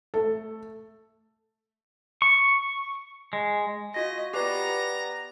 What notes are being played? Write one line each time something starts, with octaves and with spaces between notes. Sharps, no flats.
A3 A4
C#6
G#3
F4 F#4 D#5 A#6
B3 G4 B4 D5 A#5